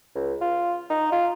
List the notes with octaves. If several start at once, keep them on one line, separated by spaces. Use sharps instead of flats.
C#2
F4
D#4
F4